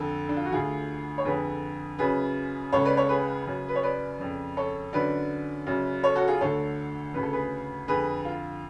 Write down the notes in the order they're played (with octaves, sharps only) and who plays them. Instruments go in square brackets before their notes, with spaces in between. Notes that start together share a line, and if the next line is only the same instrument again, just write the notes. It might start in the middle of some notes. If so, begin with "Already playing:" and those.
Already playing: [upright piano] F2 D3 A4
D4
F4
F#4
D2 D3 F4 G#4
C#5
F2 D3 G#4 B4
F#2 C#3 G#4 B4
C#2 C#3 A4 C#5
B4 D5
A4 C#5
G#4 B4
F#2 C#3
B4
C#5
B4 D5
F2 C#3
A4 C#5
F#2 D3 B4 D5
F#2 C#3
A4 C#5
F#4 A4
F4 G#4
D2 D3 A4 C#5
D2 C#3 B4
A4
G#4 B4
F2 D3 G#4 B4
F4